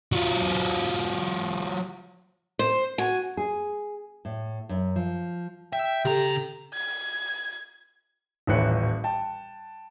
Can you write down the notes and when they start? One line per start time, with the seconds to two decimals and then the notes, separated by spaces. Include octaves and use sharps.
0.12 F#3 F4
2.59 C5
2.98 F#4 G#5
3.37 G#4
4.25 A2
4.69 F#2
4.96 F3
5.73 E5 G5
6.05 C#3 G4 A4 A#5
6.74 G#6
8.47 D#1 A1 A2 E3 F#6 C#7
9.04 G5 A5